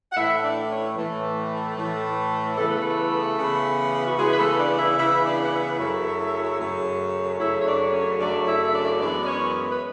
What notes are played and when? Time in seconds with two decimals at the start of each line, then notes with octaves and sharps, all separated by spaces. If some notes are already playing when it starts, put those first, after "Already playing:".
0.13 F#5
0.16 A2 E3 A3 E4 E5
0.43 D4 D5
0.70 C#4 C#5
0.97 A2 E3 A3
1.77 A2 E3 A3
2.57 C#3 E3 B3 A4
2.68 B4
2.78 A3 A4
3.38 C#3 E3 B3
4.07 F#4
4.18 C#3 E3 G#3 B3 G#4
4.33 B4
4.38 A3 A4
4.58 D4 D5
4.78 E4 E5
4.98 C#3 E3 B3 E4 E5
5.25 D4 D5
5.44 F#5
5.52 E4 E5
5.79 F#2 C#3 F#3 A3
6.59 F#2 C#3 F#3 A3
7.39 F#2 C#3 F#3 A3 E4 E5
7.60 C#5
7.66 D4 D5
7.84 D5
7.93 C#4 C#5
8.19 F#2 C#3 F#3 A3 D4 D5
8.46 E4 E5
8.64 E5
8.73 D4 D5
9.00 F#2 E3 G#3 B3 D4 D5
9.21 D5
9.27 C#4 C#5
9.70 B4